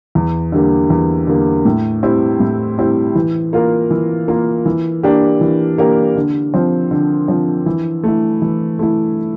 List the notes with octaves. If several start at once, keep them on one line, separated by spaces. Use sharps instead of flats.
E2
D3 G3 A#3
E2
D3 G3 A#3
A2
G3 C4 E4
A2
G3 C4 E4
E3
A#3 F4 A#4
E3
A#3 F4 A#4
E3
A#3 D4 G4 A#4
E3
A#3 D4 G4 A#4
D3
F3 C4
D3
F3 C4
E3
A3 E4
E3
A3 E4